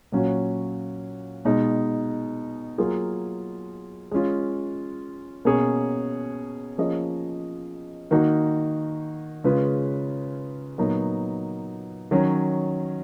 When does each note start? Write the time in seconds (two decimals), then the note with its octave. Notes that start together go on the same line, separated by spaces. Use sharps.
0.12 A#2 F#3 C#4 F#4
1.45 B2 G#3 D#4
2.78 F#3 A#3 F4 G#4
4.11 G#3 C#4 F4
5.45 B2 A#3 C#4 G#4 C#5
6.78 F3 A#3 C#4 G#4 D#5
8.11 D#3 A#3 D#4 F#4
9.44 C#3 G#3 C#4 F4 B4
10.78 A#2 F#3 B3 D#4 A#4
12.11 D#3 F#3 C#4